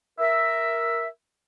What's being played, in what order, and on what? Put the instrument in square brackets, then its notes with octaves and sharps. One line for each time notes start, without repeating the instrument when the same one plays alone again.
[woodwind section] A#4 E5